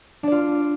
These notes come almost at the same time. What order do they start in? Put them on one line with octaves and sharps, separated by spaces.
D4 D5 F4